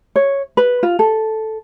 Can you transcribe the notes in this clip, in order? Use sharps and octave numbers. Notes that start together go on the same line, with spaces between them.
C#5
B4
F4
A4